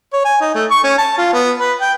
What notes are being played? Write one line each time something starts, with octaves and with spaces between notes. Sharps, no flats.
C#5
G#5
D#4
A3
C#6
C#4
A5
F4
B3
B4
G5